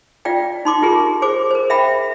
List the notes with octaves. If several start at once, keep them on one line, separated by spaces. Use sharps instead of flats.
F4 D5 F5 G5
D#4 C6 D6
F4 G4 G#4 A#4
G#4 C5 D6
A#4 C5
E5 F5 G5 B5